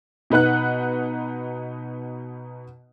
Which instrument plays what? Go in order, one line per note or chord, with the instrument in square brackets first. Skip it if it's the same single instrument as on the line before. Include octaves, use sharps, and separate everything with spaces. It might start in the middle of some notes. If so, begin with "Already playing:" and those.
[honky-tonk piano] B2 D#4 B4 F#5 F#6